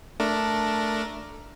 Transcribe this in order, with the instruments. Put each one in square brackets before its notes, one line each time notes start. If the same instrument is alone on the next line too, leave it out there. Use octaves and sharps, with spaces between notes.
[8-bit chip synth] A3 D4 A#4